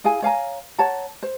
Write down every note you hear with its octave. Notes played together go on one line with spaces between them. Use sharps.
E4 G#4 F5 G#5
C#5 F5 G#5 A#5
C#5 F#5 A5 A#5
C5